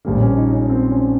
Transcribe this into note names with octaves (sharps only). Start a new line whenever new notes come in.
A#1 A#2 G3 A#3
C#4
D#4
C#4
C4
C#4